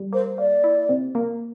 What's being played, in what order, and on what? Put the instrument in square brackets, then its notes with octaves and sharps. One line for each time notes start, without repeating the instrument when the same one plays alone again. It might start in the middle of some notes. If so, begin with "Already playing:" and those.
Already playing: [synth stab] G3
[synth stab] A#3 [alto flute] C5
[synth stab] A#3 [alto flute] D5
[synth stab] E4
C3
A#3